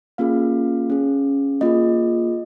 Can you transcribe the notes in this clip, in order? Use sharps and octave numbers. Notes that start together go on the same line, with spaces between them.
A#3 C#4 F4 G#4 F5
C#4 G#4
A#3 F4 G#4 D#5